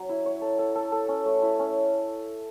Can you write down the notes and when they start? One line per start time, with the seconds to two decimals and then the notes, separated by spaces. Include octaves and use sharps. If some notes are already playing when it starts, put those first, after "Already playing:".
Already playing: F#3 C#4
0.09 E4
0.26 C#5
0.41 A4
0.59 A4
0.75 A4
0.92 A4
1.08 C#4
1.26 A3
1.42 E4
1.59 C#4